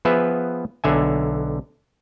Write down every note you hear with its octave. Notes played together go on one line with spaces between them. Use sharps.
F3 B3 G#4 B4 E5
B1 D3 E5 G#5